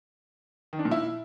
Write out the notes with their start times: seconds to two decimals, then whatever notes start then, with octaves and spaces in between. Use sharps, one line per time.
0.73 D#3
0.79 D4
0.85 A#2
0.91 E4